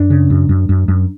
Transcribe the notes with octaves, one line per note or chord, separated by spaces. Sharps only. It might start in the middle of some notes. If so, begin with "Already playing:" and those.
Already playing: F#2 D4
C#3
F#2
F#2
F#2
F#2